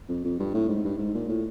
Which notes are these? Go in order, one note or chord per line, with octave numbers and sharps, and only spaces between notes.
F2
F2
G2
A2
G#2
G2
G#2
A#2
A2